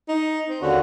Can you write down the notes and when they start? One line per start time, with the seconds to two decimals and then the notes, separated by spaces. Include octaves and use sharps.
0.09 D#4
0.49 C4
0.62 D#2 D3 C#4 F#4